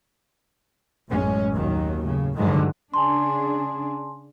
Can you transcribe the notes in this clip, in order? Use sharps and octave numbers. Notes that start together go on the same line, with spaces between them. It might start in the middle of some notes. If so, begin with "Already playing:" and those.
A1 F#2 G#3 C#4
D#2 A#2 D#3 F#3
A2 C#3
G2 D3 D#3 F3 F#3 G#3
C#3 D4 G#4 G#5 A5 C6